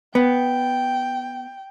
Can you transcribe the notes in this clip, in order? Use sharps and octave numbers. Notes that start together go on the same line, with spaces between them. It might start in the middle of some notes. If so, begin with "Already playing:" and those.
B3 G5